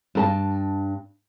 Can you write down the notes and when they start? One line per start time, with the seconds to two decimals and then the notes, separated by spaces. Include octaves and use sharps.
0.15 G2 A#4 A5